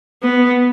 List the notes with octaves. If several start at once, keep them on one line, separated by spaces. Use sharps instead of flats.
B3